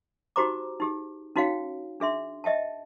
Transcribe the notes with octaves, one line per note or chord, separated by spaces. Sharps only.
D#4 F#4 G4 C5 A#5 D6
D#4 G4 G#4
C#4 D#4 F#4 C#5 F5 G5
D4 G#4 E5 C6
D#5 E5 G5 A5